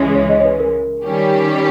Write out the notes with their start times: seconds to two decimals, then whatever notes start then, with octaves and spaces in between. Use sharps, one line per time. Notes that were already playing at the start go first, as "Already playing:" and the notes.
Already playing: C#2 C#3 E3 G#3 C#4
0.15 C#5
0.29 D#5
0.40 C#5
0.45 B4
0.60 A#4
1.05 D#3 G3 C#4 G4